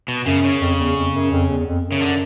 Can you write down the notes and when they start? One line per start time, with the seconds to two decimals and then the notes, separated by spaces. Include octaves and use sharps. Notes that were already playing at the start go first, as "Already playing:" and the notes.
0.08 B2
0.26 F#2 C#3
0.45 C#3
0.61 F2
0.79 E2
0.96 F2
1.14 F#2
1.31 F2
1.50 E2
1.67 F2
1.85 F#2
1.92 C#3
2.01 D3